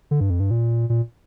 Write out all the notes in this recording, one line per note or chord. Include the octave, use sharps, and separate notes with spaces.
D3
G2
F2
G2
A#2
A#2